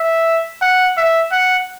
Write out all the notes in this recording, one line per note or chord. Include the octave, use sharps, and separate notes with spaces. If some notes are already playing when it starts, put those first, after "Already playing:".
Already playing: E5
F#5
E5
F#5